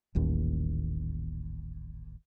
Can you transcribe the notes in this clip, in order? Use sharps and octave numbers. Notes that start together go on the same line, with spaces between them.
D#1 A1 D#2